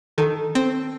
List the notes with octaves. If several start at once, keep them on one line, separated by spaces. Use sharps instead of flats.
D#3 A4
C4